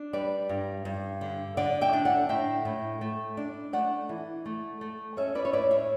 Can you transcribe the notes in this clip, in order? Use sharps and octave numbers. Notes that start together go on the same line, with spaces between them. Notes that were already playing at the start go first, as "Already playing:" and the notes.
Already playing: D4
G3 B4 D5
G2
G2
D3
D3 D5 F#5
E5 G5
D4
D5 F#5
A2 E5 G5
A2
A3
D4
A3 D5 F#5
E3
A3
A3
C#4 C#5 E5
B4 D5
C#5
A2 B4 D5
C#5 E5